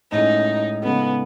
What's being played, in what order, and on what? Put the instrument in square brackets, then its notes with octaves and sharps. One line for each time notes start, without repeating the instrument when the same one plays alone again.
[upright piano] A2 G#3 C#4 [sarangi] D#4
[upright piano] C#3 G#3 D#4 A4 [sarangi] B3